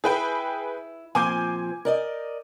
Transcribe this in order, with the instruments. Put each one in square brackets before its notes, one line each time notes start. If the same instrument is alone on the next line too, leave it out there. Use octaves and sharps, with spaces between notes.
[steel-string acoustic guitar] E4 [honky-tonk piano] G#4 B4 G5
[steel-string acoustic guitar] A#2 F3 C4 [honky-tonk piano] G#5 D6 G6
[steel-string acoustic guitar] A#4 D5 D#5